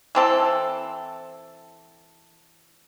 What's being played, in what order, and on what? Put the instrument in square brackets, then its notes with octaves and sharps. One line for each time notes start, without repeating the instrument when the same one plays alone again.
[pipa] E3 C4 A4